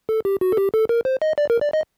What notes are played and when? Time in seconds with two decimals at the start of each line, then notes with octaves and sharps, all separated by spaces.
0.09 A4
0.25 G4
0.41 F#4
0.52 A4
0.57 G4
0.74 A4
0.89 A#4
1.05 C5
1.22 D#5
1.38 D5
1.50 A#4
1.61 D5
1.73 D#5